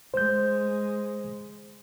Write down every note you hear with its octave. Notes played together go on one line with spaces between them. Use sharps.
G#3 C5 G6